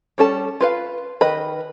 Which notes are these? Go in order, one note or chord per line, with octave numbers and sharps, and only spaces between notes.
G3 C#4 A4 A5
F4 B4 F5
D#3 B4 D#5 B5